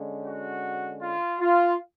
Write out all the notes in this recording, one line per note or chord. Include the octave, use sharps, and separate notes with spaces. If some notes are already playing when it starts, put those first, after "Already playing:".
Already playing: D3 G#3 C#4
F#4
F4
F4